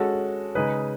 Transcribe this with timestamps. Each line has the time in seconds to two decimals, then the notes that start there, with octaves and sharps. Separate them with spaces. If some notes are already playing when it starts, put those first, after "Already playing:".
Already playing: G#3 C#4 F#4 A4
0.55 C#3 G#3 D#4 G#4 B4